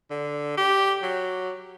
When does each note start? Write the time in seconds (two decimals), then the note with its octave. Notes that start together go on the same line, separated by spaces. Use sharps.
0.10 D3
0.57 G4
1.03 F#3